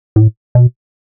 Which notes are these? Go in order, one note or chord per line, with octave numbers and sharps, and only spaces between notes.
A2
B2